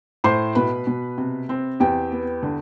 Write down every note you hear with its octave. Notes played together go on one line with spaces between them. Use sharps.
A2 C5 C6
B2 B4 B5
B2
C3
C4
E2 G4 G5
B3
D3